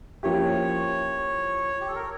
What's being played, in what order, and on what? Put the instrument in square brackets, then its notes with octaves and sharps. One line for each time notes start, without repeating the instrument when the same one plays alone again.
[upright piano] F3 A#3 C#4 E4 G4 [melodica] C#5
[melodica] G4
A4
A#4
C#5